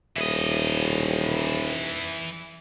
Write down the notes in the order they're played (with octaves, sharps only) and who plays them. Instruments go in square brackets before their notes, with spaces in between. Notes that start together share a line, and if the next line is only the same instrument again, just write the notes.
[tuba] D#1 [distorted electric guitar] E3 D#5